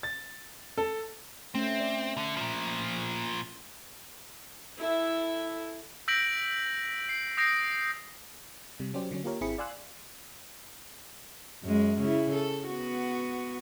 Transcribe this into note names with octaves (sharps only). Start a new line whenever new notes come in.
A6
A4
A3 C4 C#4
D5
D3
A#2 F3
E4 A4 E5
E6 G6 A#6 B6 D7 F#7
C7
D#6 G6 A#6 C7 D7
C3 G3
F#3 C#4 G4 C5 D5
D3 F#3 C#4
A#3 F4 G4 A#4 C#5
G#1 C4 E4 G#4 B5 C#7
D5 F5 G#5 C6 E6 F#6
F#2 G#3
C#3 E4
A4
B3 F#4